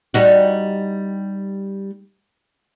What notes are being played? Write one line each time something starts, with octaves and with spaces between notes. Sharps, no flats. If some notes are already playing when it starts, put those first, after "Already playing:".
G3 D#4 F#4